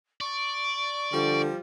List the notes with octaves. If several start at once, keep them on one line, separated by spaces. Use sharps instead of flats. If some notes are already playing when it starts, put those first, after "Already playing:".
D5 C#6
D3 F3 G3